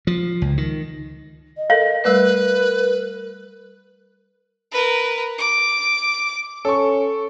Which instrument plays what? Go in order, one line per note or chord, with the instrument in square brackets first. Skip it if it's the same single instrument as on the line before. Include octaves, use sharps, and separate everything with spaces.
[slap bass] F3
C#2
D#3
[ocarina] D#5
[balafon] A4 A#4 [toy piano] F5
[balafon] G3 A3 D5 [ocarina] A#4 [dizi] B4
[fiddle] A#4 B4
D6
[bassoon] C#4 [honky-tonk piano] A4 C#6